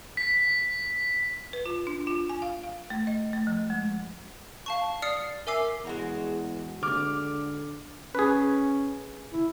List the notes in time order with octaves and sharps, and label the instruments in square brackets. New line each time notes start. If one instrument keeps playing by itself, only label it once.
[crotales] B6
[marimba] B4
F4
D4
F4
G#5
F5
F5
A3
D#5
A3
F3
G#3
[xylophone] F5 A5 C#6
D5 D#6 F6 C7 C#7
A#4 E5 G#5 D6 E6 C7
[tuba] E2 [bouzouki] G#3 F#4 A#5
[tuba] D3 [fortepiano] D6 F6
[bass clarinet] C#4 [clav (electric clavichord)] G#4 B4
[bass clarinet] E4